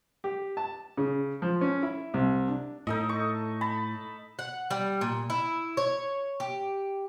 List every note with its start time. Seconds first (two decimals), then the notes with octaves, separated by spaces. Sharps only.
0.24 G4
0.57 A5
0.97 C#3
1.42 F3
1.61 C#4
1.83 E4
2.14 C2
2.48 D4
2.87 A2 D#4 A4 D#5
3.09 C#6
3.61 A5 B5
4.39 F#5
4.70 G3
5.01 A#2
5.30 E4
5.77 C#5
6.40 G4